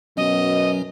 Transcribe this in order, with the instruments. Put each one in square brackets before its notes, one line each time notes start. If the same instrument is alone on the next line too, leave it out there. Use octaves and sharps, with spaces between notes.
[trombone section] F#2 B2 [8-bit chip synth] F#3 C#4 [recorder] D#5